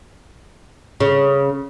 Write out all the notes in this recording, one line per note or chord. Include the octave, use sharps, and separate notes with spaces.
C#3